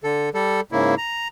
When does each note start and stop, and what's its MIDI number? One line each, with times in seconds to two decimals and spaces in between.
0.04 0.29 50
0.04 0.29 69
0.34 0.61 55
0.34 0.61 69
0.72 0.95 44
0.72 0.95 49
0.72 0.95 58
0.72 0.95 64
0.98 1.28 82